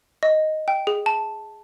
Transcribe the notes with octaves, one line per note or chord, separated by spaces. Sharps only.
D#5
G5
G#4
A5